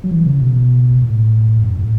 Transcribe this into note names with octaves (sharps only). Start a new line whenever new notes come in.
F#3
E3
C#3
B2
A2
F#2
A2